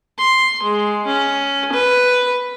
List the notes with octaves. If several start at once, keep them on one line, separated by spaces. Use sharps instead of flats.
C6
G#3
C#4
B4